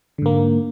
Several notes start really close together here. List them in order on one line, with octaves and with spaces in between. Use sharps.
D3 G#2 A#3